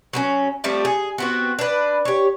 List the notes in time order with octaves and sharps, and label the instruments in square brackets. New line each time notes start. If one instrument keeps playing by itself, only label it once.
[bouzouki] F#3 B3 C#4
F3 G3 A3 C4
G#4
B3 C4 F#4
D4 B4
G4 C#5